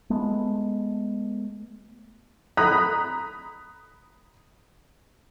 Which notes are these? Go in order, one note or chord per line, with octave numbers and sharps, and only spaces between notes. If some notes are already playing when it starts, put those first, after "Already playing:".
G#3 A3 B3
A#5 B5 D#6 F#6 B6